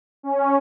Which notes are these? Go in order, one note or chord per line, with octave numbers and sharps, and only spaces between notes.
C#4